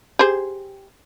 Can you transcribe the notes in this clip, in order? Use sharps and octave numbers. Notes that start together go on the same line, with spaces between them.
G4 G#4 C5